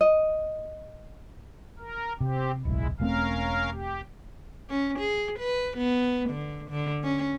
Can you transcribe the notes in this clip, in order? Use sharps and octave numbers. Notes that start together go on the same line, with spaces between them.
D#5
A#4
C3 C4 G4
D1 B1 G#3 E4
E1 A3 C4 C#4 A#4 F5
G4
C#4
G#4
B4
B3
D3
D3
C#4